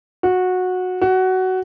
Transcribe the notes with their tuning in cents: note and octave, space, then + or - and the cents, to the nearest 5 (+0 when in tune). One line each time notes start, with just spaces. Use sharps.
F#4 -15
F#4 +15